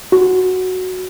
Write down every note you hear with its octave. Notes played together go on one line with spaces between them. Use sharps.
F#4